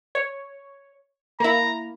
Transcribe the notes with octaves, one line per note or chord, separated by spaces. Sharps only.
C#5
A#3 E4 A#5